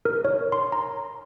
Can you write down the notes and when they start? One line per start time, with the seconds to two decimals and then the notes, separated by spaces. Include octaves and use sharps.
0.05 A#4
0.25 C#5
0.52 C6
0.72 A#5